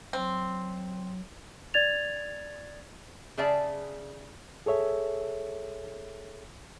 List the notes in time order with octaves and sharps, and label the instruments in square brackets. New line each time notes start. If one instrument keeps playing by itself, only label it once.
[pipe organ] F#3 [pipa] C4
[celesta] D5 G#6 A6 F7
[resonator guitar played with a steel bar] C#3 G#4 D5 E5 A5
[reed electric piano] G#4 A4 C#5 E5